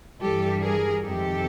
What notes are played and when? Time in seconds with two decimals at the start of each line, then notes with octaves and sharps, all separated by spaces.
0.20 G2 E3 G3 G4 A4
0.62 G#4 A#4
1.03 F2 C3 D#3 G#3 G4 A4